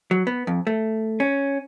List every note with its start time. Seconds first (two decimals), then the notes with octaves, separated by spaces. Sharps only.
0.11 F#3
0.27 B3
0.47 F2
0.67 A3
1.20 C#4